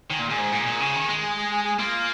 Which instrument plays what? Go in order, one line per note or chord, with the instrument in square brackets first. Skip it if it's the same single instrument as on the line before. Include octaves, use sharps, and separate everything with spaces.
[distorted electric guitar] D#3 [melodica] G#5
[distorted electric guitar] A#2 [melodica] F5
[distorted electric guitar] A#2 [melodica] G#4 G#5
[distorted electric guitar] G#2
A#2
A#2
C#3
D#3
G#3
[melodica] G#4 G#5
G#4 G#5
G#4 G#5
G#4 G#5
[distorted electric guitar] A#3 [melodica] F4 F5